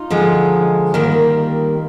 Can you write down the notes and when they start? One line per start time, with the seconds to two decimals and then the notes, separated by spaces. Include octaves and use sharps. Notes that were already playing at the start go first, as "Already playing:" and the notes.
Already playing: D#4 F4
0.10 D3 F3 G#3
0.94 D#3 G3 A#3